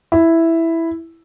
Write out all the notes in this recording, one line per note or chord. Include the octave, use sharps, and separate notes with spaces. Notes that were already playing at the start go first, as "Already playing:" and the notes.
E4